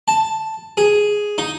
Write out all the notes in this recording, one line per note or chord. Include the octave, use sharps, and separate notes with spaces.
A5
G#4
D#4